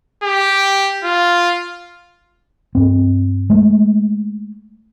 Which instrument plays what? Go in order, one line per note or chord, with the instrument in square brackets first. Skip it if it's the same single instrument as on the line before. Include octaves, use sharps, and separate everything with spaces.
[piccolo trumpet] G4
F4
[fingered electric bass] G2 C4
G#3 A3